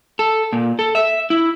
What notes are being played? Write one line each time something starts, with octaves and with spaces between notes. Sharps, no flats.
A4
A#2
A4
E5
E4